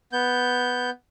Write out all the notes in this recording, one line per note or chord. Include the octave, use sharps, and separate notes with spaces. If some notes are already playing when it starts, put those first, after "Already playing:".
B3 G6